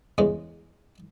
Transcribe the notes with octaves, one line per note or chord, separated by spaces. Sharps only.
E2 C#3 G#3